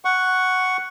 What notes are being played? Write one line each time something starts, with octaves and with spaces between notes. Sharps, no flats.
F#5 C#6